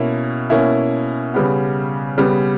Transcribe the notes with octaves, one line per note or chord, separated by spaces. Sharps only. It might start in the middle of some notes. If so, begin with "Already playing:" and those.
Already playing: B2 A#3 C#4 E4
B2 A#3 C#4 E4
C#3 G3 B3
C#3 G3 B3